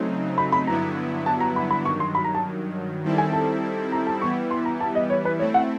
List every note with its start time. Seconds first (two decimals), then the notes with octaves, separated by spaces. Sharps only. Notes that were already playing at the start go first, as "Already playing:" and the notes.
Already playing: C#3 F#3 A3 C4 D#4
0.38 B5
0.52 B5
0.67 G2 D3 F#3 B3 E4 A#5
1.26 A5
1.40 A#5
1.56 B5
1.71 B5
1.85 G2 D#3 F#3 C#6
2.00 C6
2.15 B5
2.24 A#5
2.35 A5
3.04 D#3 G3 C4 E4 A4
3.18 G#5
3.33 A5
3.92 A#5
4.07 A5
4.21 E3 G3 B3 E4 C#6
4.51 C6
4.65 A#5
4.80 A5
4.95 D#5
5.10 C#5
5.25 B4
5.39 A3 C4 E4 C#5
5.54 F#5